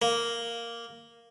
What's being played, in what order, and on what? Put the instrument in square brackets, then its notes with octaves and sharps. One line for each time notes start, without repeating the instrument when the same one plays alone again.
[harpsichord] A#3